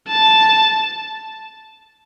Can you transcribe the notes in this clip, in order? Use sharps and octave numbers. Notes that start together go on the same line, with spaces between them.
A5